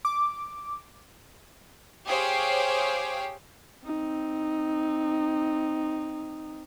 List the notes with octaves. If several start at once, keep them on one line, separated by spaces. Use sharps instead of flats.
D6
G4 G#4 C5 C#5 F5 G5
C4 D#4